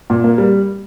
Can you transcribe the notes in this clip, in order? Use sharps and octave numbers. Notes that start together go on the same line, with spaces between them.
A#2
A#3
G3